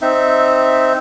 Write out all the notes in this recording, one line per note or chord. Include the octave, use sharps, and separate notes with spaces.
C4 D#4 E5